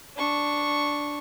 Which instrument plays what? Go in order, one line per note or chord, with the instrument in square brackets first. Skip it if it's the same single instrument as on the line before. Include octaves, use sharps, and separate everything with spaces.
[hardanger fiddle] D4 C#6